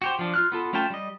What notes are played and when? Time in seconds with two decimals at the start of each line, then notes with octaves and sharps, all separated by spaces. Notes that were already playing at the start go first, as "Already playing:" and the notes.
0.02 F#4 G4 C5
0.19 F3 D4
0.34 F4 F6 F#6
0.52 B3 F4 A4
0.73 A3 C#4 F4 G5 A5
0.90 G3 D#5